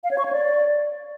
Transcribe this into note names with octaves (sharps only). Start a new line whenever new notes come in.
F5
C#5
C#6
C#5
D5